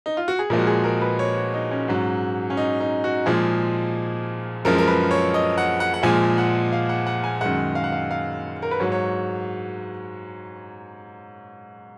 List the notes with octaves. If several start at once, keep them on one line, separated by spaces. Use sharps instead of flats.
D#4
F4
F#4
G#4
A#2 F3 G#3 A#4
F#4
G#4
A#4
B4
C#5
F#4
D#4
C#4
G#2 F#3
C#4
D#4
D#4
F#4
A#2 F3 G#3 G#4
F#2 F3 G#3 A#4
A#4
B4
C#5
D#5
F#5
F#5
F#5
A#2 F3 G#3 G#5
F#5
F5
F#5
F#5
G#5
F#2 D#3 G#3 F#5
F5
F#5
F5
F5
A#4
B4
G#2 F#3 C#5
C#5